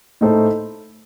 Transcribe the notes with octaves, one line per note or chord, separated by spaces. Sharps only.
A2 A3 D#4 A4 C5